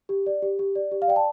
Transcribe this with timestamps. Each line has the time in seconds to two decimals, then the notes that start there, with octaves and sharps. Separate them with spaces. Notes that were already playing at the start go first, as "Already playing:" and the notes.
0.09 G4
0.26 D5
0.42 G4
0.59 G4
0.75 D5
0.92 G4
1.02 F5
1.08 D5 G5
1.16 A5